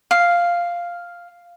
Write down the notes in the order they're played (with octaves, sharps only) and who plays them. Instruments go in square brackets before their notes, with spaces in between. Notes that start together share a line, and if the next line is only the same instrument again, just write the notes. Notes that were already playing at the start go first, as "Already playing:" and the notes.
[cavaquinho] F5